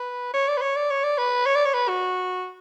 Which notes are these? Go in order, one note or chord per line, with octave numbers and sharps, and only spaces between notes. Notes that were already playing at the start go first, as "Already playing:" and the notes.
Already playing: B4
C#5
D5
B4
C#5
D5
C#5
D5
B4
C#5
D5
C#5
B4
F#4